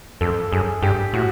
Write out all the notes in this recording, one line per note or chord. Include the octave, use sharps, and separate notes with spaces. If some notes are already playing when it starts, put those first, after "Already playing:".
F2 A4
F#2 G#4
G2 G4
A2 F#4